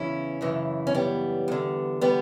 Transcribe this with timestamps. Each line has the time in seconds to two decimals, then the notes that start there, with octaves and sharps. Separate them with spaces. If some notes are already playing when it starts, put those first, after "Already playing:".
Already playing: E2 C#3 E3 C#4 E4
0.41 F#2 C#3 E3
0.87 C#4
0.95 G3 B3
1.48 E2 D3
2.01 G3 B3